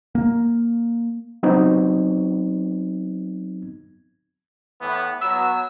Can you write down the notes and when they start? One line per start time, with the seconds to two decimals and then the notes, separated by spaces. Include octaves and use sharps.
0.15 A#3
1.43 F#3 B3 C4 D#4
4.82 A2 E3 B3
5.21 F#3 B3 E6